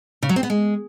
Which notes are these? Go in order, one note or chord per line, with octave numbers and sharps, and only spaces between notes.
C#3
F#3
C4
B3
G#3